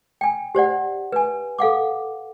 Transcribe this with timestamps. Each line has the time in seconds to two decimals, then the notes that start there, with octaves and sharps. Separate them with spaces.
0.21 G5 G#5
0.55 G4 C5 D5 F#5
1.12 B4 G#5
1.59 A4 F5 F#5 D6